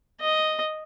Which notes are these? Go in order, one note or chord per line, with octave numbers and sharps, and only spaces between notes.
D#5